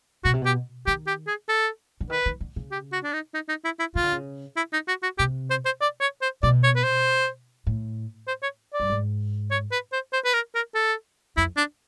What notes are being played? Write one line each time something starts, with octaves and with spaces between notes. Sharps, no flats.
B2 F#4
C3
B2 G4
D#3 G4
G4
G#4
A4
D3
D#3 B4
D#3
D3
C#3
G4
F#4
D4
D#4
D#4
D#4
E4
E4
C#3 F4
D3
C#3
E4
D#4
F#4
F#4
C3 G4
C5
C5
D5
C#5
C5
B2 D5
C#5
B4
C5
A2
C5
C#5
D5
G2
G#2
C#5
B4
C5
C5
B4
A#4
A#4
A4
F2 E4
D4